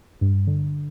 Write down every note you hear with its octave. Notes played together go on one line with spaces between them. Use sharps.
G2
D3